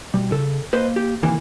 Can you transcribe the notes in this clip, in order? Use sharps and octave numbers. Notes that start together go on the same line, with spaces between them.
B2 G3
C#3 A4
A#3 B4 C5 D#5
G4
C3 D#3 E3 A#3